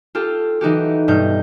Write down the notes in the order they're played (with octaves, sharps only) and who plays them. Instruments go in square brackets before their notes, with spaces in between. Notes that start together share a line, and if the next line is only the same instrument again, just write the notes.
[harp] F4 G4 A4
E3 D#4 F#4 G4
G2 B2 D#4 G6